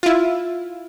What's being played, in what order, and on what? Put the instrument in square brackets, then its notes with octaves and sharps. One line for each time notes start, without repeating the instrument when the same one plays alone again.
[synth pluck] E4 F4